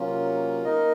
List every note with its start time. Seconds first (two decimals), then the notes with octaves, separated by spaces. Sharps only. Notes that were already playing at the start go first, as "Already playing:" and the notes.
Already playing: C3 F#3 A#3 C#4 F4
0.65 A#3 D#4 A#4 D#5